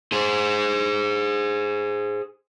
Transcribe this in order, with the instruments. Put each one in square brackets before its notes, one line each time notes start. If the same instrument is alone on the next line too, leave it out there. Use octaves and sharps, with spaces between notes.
[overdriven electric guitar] G#4 C5